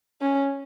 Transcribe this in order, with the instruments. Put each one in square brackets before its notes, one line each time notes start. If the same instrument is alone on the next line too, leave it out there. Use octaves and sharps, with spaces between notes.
[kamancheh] C#4